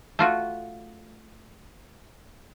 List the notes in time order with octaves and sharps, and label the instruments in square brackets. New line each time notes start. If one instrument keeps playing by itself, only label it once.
[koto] A3 F4 F#4